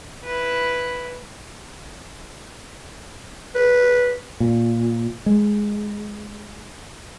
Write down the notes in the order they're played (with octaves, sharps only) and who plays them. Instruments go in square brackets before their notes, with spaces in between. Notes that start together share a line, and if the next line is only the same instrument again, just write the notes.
[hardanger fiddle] E4 B4
[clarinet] B4
[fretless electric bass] A#2
G#3